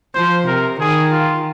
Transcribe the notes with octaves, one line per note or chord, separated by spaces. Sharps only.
F3 C5
C3 A#4
D#3 G#4
F4